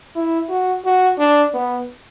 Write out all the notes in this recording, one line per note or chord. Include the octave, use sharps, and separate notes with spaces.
E4
F#4
F#4
D4
B3